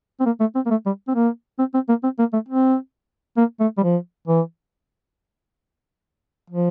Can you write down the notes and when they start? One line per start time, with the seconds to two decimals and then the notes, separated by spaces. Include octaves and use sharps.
0.20 C4
0.26 A#3
0.40 A3
0.55 C4
0.66 A#3
0.70 A3
0.86 G3
1.08 C4
1.15 A#3
1.59 C4
1.74 C4
1.89 A#3
2.03 C4
2.19 A#3
2.33 A3
2.48 C4
3.37 A#3
3.60 A3
3.78 G3
3.83 F3
4.27 E3
6.50 F3